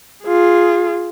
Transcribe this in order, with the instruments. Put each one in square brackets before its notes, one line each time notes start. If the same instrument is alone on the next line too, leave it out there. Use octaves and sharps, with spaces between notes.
[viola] F4 G#4